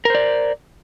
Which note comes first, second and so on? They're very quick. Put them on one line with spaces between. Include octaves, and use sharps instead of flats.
A#4 C5 D5